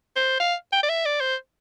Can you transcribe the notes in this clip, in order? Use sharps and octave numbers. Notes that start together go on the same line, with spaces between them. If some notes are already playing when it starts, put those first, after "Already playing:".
C5
F5
G5
D5
E5
D5
C5